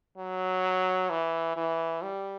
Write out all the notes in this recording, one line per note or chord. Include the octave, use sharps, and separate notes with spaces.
F#3
E3
E3
G3